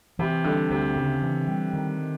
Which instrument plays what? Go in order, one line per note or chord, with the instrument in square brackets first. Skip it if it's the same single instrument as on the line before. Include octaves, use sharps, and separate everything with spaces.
[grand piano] C3 [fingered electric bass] E3
[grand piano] D3 [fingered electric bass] G3
[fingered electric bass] D2 [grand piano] C3
[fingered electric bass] C#3
E3
G3
D#3